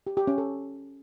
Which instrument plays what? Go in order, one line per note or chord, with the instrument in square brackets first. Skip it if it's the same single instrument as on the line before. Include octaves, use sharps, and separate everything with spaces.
[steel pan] G4
G4
C#4
A4